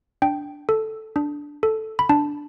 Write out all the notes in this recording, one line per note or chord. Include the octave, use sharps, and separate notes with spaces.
D4 G5
A4
D4
A4
B5
D4 A5